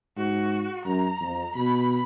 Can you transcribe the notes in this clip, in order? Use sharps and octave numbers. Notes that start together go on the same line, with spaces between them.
G#2 F#4
F#2 A#5
F2
B2 B5